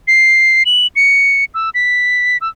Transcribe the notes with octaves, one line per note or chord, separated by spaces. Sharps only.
C7
F#7
C#7
E6
B6
E6